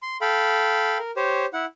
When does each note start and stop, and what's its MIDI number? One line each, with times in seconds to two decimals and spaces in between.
0.02 0.17 84
0.21 0.98 69
0.21 0.98 77
0.21 0.98 79
0.21 0.98 83
0.99 1.11 70
1.17 1.46 67
1.17 1.46 72
1.17 1.46 73
1.53 1.65 64
1.53 1.65 78